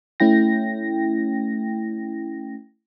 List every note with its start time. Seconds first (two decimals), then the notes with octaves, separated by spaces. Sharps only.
0.20 A3 C#4 E4 G5 A#6